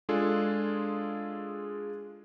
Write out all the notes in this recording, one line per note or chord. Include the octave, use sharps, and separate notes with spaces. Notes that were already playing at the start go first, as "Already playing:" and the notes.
G#3 D4 F4 G#4 A4